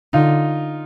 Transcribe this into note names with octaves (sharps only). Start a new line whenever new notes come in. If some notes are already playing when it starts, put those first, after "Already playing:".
D3 D#4 F4